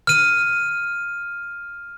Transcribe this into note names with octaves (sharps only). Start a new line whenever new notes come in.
F6 D#7